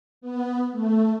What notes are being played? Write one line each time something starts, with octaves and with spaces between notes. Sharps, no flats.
B3
A3